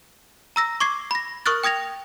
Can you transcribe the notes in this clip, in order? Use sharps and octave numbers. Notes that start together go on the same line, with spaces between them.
A#5 E6 A#6
C#6 D6 G#6 C7
B5 A#6
A#4 C#6 D#6 F6 F#6 A6
G5 D#6 G#6 A#6 F7